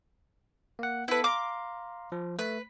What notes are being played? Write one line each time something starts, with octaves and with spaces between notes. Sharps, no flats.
A#3 F#5
B3 E4 A4 B4
F5 A#5 C6 D6
F3
A3 B4